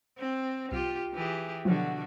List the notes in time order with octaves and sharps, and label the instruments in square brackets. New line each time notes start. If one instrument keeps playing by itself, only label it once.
[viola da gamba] C4
[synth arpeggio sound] C2 [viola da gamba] F4 G4
[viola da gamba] E3 G4 G#4
[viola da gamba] B2 D3 F#4 [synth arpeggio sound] F3 F#3